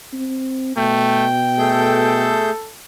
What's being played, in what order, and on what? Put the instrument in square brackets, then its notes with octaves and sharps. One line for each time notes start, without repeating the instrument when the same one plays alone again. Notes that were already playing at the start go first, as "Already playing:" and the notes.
[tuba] C4
[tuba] B2 [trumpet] A3 [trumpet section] G5
[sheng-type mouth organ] A3 G#4 G6 [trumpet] A4